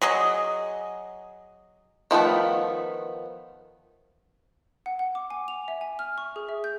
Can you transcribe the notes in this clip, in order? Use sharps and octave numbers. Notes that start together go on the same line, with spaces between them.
F#3 G#4 D#5
D#3 F3 A3 B3
F#5
F#5
D6
G#5
F7
E5
G#5
F6
C#6
G#4
E5
G6